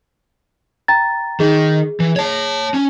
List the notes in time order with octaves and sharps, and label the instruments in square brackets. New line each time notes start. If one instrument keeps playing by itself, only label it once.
[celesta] G5 A#5 A6
[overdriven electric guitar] D#3 [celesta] G#4
[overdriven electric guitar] E3
C#5 A5
C#4